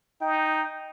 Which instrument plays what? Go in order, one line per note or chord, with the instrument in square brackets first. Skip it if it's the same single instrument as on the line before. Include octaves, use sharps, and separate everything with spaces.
[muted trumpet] D#4 [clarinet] G5